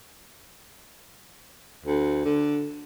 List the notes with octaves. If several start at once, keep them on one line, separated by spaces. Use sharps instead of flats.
D2
D3